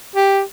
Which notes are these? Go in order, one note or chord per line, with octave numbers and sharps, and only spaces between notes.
G4